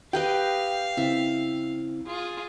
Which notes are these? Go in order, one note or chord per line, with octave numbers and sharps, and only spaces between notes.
G4 B4 D#5 F5 G5
C#3 C4 E4 E5
F4 G#4